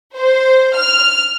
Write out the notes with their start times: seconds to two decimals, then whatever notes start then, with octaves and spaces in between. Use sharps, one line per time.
0.17 C5
0.76 F6